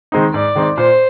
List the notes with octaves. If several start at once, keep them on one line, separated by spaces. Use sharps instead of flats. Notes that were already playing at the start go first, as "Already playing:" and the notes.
D#3 G#3 C4 D#4
G#2 D5
D#3 G#3 C4 D#4
A#2 C5